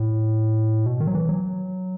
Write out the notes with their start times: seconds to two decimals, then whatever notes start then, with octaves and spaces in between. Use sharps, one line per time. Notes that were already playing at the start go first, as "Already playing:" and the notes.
Already playing: A2
0.86 B2
1.00 D#3
1.07 F#3
1.15 E3
1.29 F#3